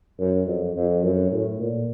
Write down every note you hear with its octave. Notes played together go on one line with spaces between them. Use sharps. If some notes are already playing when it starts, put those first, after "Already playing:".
F#2
F2
F2
F#2
A2
A#2